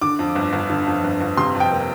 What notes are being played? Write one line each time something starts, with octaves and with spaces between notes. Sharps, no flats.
D3 D6
F2
G1
G1
D3
F2
G1
G1
C3 C6
F2
G5
A#3